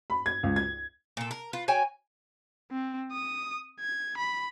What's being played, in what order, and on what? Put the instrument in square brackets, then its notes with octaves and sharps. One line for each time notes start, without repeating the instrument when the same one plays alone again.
[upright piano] B5
G#6
C#2
G#6
[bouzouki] A#2 A4
A#4
F4 B4
F#4 C#5 G5 G#5
[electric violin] C4
D#6
G#6
B5